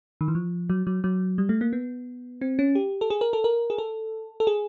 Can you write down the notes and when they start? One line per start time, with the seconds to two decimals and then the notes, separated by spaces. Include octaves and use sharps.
0.21 D#3
0.28 E3
0.35 F3
0.70 F#3
0.87 F#3
1.04 F#3
1.38 G3
1.49 A3
1.61 A#3
1.73 B3
2.41 C4
2.59 C#4
2.75 G4
3.01 A4
3.10 G#4
3.21 A#4
3.33 A4
3.44 A#4
3.70 G#4
3.78 A4
4.40 A4
4.47 G#4